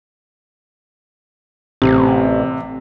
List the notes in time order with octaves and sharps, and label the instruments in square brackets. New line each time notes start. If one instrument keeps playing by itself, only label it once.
[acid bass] A1 [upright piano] C3